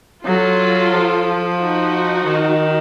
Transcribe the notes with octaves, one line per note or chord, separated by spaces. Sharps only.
F#3 F4 A4
F3
D#4 F#4
D#3